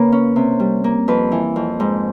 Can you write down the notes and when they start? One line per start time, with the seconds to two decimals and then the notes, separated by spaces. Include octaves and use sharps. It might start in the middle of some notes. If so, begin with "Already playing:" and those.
Already playing: C#3 A#3 B4
0.12 C#4
0.36 C3
0.60 G3
0.84 A#3
1.08 F2 B4
1.32 E3
1.56 F2
1.80 G#2